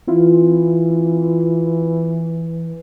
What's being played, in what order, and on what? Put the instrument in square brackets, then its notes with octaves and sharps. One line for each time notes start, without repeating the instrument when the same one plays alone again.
[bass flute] E3 [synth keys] C4 E4 F4